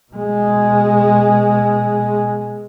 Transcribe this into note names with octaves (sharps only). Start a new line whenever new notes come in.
B2 G#3